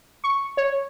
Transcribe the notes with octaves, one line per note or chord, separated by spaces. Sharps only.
C#6
C#5